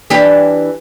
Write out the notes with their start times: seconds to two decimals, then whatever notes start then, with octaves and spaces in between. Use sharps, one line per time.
0.10 E3 D4 G4